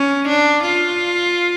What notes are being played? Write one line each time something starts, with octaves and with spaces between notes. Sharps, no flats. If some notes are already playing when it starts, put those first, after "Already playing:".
Already playing: C#4
D4
F4